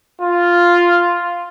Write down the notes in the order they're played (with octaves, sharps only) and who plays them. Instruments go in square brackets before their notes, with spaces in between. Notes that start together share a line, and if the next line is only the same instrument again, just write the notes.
[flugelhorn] F4